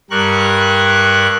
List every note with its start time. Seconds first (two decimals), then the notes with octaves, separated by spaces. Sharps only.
0.11 G2 G3 A#4 C#6 F#6